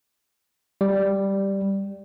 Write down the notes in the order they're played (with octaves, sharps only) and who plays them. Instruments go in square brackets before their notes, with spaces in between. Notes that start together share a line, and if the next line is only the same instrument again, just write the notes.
[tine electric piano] G3